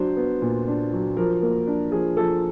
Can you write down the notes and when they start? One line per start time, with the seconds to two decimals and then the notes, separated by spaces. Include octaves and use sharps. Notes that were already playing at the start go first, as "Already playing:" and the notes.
Already playing: F#3 D4 C5
0.17 B3
0.42 A#2
0.68 D4
0.93 F#3
1.17 F3 A#4
1.42 A#3
1.67 D4
1.92 F3 G#4
2.17 F3 A4